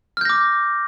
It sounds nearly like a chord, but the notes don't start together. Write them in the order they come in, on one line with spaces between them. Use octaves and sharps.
F6 G6 A#6 D6